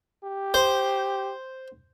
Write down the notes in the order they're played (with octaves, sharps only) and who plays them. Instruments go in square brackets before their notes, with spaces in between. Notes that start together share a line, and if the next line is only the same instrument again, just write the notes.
[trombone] G4
[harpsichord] C5